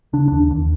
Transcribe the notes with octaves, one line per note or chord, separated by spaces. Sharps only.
C#3 D4
D#2 D4
D#2